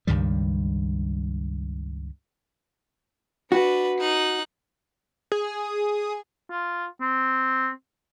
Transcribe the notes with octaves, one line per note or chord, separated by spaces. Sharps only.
C#2 G2 D#3 G3
D4 F#4 B4
D#4 F#6
G#4
F4
C4